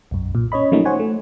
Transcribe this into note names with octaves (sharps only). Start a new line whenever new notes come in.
B1 F#2
A#2
C#4 C#5 D#5 B5
F3 F#3 A3 A#3 C#4 D#4
C5 C#5 F#5 G#5
A3